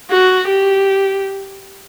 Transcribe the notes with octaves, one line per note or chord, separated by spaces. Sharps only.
F#4
G4